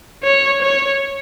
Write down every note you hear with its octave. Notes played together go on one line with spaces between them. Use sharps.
C#5
C#5